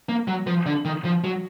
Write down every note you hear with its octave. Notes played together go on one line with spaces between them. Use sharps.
A#3
F#3
F3
D3
D#3
F3
F#3